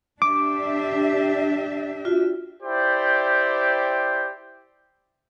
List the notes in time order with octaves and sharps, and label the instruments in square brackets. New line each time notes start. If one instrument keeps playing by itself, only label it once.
[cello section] D4 G4 E5 [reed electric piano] D6
[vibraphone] F4 F#4
[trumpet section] E4 G4 C5 D5 G5